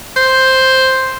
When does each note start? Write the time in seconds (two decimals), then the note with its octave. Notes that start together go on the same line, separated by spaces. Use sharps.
0.16 C5